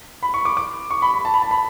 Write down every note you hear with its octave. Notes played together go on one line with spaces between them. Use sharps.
B5
C#6
D6
D6
C#6
B5
B5
A5
B5
A5
B5